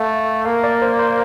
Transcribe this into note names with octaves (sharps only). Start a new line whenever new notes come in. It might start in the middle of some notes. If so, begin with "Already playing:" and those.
Already playing: A3 F5
A#3 F5
D5
C5
C5